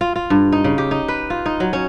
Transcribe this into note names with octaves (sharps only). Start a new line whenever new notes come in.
F4
F4
G2
D#4
C#3
G4
D#4
B4
F4
D#4
F#3
C#4